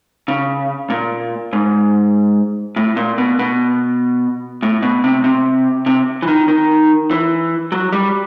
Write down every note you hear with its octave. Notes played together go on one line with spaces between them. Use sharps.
C#3
A#2
G#2
A2
A#2
B2
B2
A2
B2
C3
C3
C3
E3
D#3
D#3
E3
F#3
G3